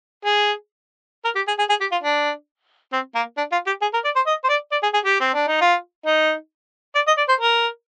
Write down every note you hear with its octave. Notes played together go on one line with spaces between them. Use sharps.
G#4
A#4
G4
G#4
G#4
G#4
G4
F4
D4
C4
A#3
D4
F4
G4
G#4
A#4
D5
C5
D#5
C5
D5
D5
G#4
G#4
G4
C4
D4
D#4
F4
D#4
D5
D#5
D5
C5
A#4